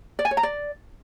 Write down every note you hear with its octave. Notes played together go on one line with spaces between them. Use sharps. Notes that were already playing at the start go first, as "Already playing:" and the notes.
D5
G#5
C#5
A#5
D5